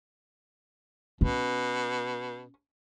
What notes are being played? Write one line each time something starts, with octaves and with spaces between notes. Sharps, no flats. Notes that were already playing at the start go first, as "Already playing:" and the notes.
B2 C#4